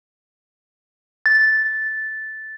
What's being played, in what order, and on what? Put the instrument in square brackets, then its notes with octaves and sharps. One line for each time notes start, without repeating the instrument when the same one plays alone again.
[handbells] A6